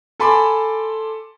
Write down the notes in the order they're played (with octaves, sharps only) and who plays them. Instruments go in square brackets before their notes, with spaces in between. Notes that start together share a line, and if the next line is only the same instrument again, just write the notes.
[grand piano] A4 G#5 A5 B5 C6 D6